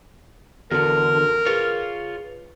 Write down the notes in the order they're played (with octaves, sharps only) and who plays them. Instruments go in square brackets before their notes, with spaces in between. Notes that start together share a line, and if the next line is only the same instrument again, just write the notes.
[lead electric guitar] E2 D3 [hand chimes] F#4 A4 [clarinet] A#4
[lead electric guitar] F4 C#5 [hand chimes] G#4 B4